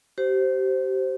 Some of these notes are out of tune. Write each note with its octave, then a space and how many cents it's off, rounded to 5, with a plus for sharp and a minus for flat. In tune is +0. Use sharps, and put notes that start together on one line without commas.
G4 -35 C5 +0